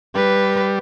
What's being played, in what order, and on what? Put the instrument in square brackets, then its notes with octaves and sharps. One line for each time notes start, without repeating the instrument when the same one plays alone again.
[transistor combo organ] G3 [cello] B4